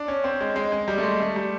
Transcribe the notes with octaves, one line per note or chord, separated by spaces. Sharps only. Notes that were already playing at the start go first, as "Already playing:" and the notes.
Already playing: D4
C#4
C4
G#3
G#3
G#3
G3
A3
G#3
A3
G3